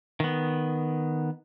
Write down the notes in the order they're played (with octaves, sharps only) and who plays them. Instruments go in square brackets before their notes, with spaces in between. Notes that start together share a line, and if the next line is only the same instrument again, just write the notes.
[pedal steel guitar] D#3 B3